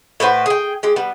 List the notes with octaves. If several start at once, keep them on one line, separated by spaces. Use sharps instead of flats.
A2 B4 C5 F#5
G#4 G5
G#3 G4
G3 B3